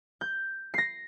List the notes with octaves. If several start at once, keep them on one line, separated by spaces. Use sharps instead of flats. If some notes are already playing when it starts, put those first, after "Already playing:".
G6
A#6 C7